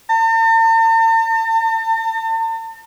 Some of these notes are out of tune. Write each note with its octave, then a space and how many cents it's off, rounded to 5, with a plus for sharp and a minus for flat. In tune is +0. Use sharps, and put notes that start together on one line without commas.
A5 +45